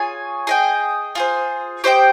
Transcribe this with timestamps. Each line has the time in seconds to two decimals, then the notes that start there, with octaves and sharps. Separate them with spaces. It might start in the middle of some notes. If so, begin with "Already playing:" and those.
Already playing: F4 G#4 C#5 G#5
0.47 G#4 D#5 G5
1.15 F4 G#4 C5
1.84 G4 C5 D#5 G5